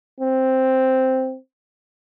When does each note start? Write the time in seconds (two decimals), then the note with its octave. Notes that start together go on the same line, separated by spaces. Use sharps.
0.20 C4